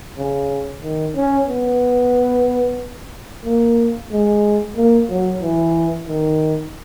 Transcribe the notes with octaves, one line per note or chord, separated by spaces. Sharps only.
C#3
D#3
C#4
B3
A#3
G#3
A#3
F#3
E3
D#3